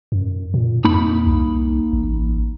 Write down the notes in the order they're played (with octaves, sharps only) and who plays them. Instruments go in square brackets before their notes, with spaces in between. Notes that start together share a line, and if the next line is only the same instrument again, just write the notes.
[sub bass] F#2
A#2
[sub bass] F2 [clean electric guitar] A#3 D#4 B5
[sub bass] C2
A1